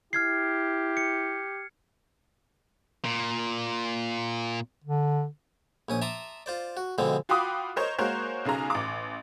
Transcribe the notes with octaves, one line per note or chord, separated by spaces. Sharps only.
E4 G4 F6 G#6 C7
C#7
A#2
D3
A#1 C#4 D#6
E5 A5 A#5 C6 D6 D#6
F4 C5 D5
F#4
B2 D3 F3 G#3 C4
F4 F#4 G5 B5 D6 D#6
A#4 C5 C#5 D#5
G#3 A#3 F#4 A#4 C5 C#5
B1 C#3 G#4 A#5
A1 D6